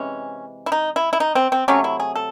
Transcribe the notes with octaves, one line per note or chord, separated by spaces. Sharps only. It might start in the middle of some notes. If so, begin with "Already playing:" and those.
Already playing: C3 E3 G#3 C#4
E4
D#4
E4
E4
D#4
C4
C4
C3 F#3 A3 C#4
E4
G#4
A4